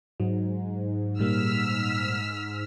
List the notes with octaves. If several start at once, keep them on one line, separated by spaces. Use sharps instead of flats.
G#2 F#3
A#2 G3 A#3 E6 F6 B6